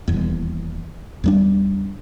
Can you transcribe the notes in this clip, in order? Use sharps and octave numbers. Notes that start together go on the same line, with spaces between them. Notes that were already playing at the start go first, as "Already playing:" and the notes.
D#1 E2
E2 G3 D4